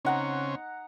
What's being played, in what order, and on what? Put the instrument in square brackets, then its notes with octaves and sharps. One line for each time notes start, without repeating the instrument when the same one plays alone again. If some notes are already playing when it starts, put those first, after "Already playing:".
[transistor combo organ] C#3 C4 C#4 [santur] D#4 F#5 A#5